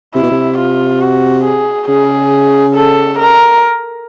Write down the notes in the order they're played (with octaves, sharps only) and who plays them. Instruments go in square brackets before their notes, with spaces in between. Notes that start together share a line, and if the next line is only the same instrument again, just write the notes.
[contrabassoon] C3 [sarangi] E4
[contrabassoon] B2
C3
[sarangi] F4
F#4
G#4
[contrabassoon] C#3 [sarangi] G#4
[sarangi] A4
A#4